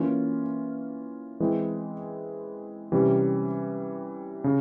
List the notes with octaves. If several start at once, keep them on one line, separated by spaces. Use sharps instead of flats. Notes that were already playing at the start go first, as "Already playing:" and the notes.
Already playing: E3 A#3 C#4 F4
E3 G#3 C4 E4
C3 E3 G3 C#4
C#3